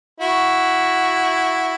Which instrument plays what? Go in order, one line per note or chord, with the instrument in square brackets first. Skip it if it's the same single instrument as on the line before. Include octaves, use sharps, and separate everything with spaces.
[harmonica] E4 F#4